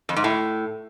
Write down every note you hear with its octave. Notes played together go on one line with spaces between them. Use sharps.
F2
G#2
A2